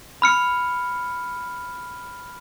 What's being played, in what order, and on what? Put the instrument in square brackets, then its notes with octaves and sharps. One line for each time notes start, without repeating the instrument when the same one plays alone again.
[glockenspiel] B5 F6 C#7